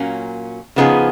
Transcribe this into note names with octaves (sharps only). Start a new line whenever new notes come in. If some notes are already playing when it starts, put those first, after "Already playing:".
Already playing: A#2 F#3 A#3 C#4
C#3 F3 B3 D#4 G#4